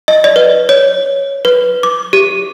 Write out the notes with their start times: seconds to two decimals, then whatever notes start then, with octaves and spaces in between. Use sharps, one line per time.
0.08 D#5
0.24 D5
0.36 B4
0.69 C#5
1.45 B4
1.83 D6
2.13 G4